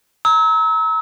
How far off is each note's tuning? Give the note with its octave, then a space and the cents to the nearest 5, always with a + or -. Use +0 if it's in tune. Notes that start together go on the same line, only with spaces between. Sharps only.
A#5 +0 E6 -35